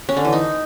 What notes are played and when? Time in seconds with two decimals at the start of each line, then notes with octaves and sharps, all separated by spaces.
0.09 C#4
0.17 D3
0.25 E3
0.33 D#4